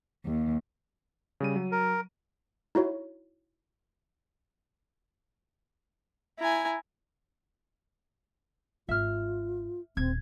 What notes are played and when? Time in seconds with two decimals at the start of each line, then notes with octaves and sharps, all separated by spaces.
0.25 D#2
1.40 C#3 G3 D#7
1.56 F#3
1.72 A#4
2.75 D#4 E4 F#4 C#5
6.40 E4 G#5 A#5
8.89 G#1 F4 E5 F6
9.97 D#1 C4 G#6